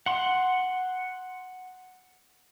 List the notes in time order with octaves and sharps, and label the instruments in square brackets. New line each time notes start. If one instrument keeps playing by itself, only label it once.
[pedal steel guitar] F#5 C6